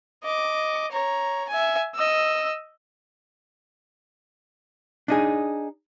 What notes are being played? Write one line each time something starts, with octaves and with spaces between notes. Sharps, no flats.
D#5 D6
C#5 A#5
E5 G#5
D#5 E6
D4 D#4 G#4